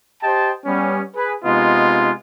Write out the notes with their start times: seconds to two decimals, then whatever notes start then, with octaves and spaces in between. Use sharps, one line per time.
0.22 G4 C5 D#5 G5 A5
0.66 G3 B3 C#4
1.15 G#4 B4
1.44 C3 G#3 B3 D#4 F4 D#5